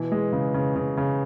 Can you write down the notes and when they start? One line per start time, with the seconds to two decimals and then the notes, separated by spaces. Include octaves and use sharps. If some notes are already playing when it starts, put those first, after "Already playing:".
Already playing: B2 E3
0.12 G#3
0.33 C#3
0.54 C#3
0.76 C#3
0.97 C#3